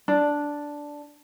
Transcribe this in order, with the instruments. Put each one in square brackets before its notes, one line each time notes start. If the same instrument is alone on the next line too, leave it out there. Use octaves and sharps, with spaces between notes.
[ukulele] D4